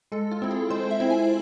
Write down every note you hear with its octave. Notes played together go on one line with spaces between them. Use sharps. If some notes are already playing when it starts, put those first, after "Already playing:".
G#3 A4
F4
C4 E4
G#4
G#3 C5
E5
C4 E4
G#5